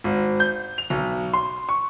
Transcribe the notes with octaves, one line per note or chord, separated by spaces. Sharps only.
G#1
G6
F7
B1
C6
C#6